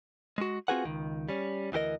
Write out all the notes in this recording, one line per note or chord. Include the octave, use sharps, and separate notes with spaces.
G#3 F#4
C4 F4 F#4 G#4 B4 F#5
C#2 D#3
G3 C#4
D2 E3 G4 A#4 D#5